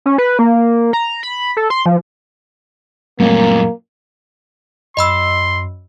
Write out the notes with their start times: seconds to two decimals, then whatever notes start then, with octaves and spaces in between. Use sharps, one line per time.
0.06 C#4
0.18 B4
0.39 A#3
0.93 A#5
1.23 B5
1.57 A4
1.70 C6
1.86 F3
3.20 F#2 A#2 G3 A3 A#3 C4
4.97 F#2 D#5 B5 C6 E6